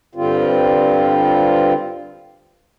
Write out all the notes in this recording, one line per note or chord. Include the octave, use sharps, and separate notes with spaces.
G2 D3 G3 C4 F4